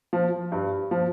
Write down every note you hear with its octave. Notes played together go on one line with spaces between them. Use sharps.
F3
G2
F3